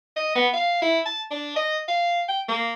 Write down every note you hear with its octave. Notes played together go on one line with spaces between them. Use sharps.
D#5
B3
F5
E4
A5
D4
D#5
F5
G5
A#3